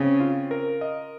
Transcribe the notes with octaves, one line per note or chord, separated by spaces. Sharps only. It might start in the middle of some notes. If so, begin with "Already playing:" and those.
Already playing: C#3 C4
F4
A#4
D#5